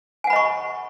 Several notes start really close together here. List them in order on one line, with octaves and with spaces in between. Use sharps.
G#5 F#5 B5 D#5 C#6